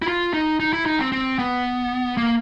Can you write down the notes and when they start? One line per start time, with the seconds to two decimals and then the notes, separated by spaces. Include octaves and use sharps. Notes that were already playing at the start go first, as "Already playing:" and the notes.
0.02 E4
0.08 F4
0.34 D#4
0.60 D#4
0.73 E4
0.86 D#4
0.99 C4
1.12 C4
1.39 B3
2.17 A#3